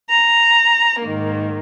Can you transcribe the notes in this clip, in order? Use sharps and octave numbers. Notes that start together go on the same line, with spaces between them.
A#5
G#2 D#3 A#3